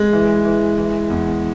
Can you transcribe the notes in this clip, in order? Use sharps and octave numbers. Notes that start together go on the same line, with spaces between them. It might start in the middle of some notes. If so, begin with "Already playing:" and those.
Already playing: G#3
E3
E3
E3
E2